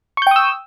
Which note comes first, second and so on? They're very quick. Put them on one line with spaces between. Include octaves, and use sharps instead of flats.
C#6 G6 G5 D#6 E6